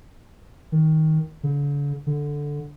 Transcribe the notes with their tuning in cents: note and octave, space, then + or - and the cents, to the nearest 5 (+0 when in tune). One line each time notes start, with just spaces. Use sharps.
D#3 +15
D3 -45
D3 -5